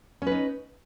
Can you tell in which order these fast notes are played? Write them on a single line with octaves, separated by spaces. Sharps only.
C#4 B4 D#4